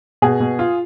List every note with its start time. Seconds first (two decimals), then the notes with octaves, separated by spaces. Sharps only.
0.22 B2 G#4
0.40 B2
0.59 F4